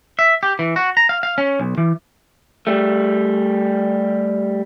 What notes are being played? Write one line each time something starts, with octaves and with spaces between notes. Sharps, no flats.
E5
G4
E3
F#4
A#5
F5
F5
C#4
B1
E3
G3 A3